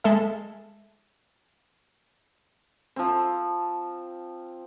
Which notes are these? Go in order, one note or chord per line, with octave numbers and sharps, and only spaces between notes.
G#3 A4 E5
F3 C4